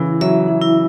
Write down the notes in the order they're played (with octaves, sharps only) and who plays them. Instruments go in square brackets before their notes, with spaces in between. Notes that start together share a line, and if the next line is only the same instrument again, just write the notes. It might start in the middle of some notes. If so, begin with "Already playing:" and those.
Already playing: [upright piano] C#3 E3 [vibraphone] E4
[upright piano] F#3 [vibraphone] E5
[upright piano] F#3
[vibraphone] E4